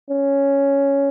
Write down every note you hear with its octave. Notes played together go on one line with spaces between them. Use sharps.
C#4